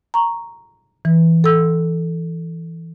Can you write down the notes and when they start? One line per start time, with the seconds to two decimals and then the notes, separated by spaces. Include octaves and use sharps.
0.14 A#5 C#6
1.05 E3
1.44 A4 E6